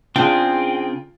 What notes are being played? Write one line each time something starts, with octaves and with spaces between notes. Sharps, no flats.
C#3 C4 D4 F4 G#4 G5